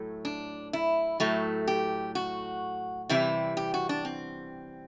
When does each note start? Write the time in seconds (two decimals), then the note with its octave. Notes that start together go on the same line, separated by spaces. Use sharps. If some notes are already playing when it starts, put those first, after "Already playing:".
Already playing: A2 F#3 A3
0.25 D4
0.73 E4
1.20 A2 F#3 A3
1.68 G4
2.15 F#4
3.09 C3 E3 G3 E4
3.57 G4
3.74 F#4
3.89 D4
4.05 C4